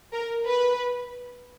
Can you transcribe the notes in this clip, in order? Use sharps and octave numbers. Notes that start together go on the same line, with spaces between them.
A#4
B4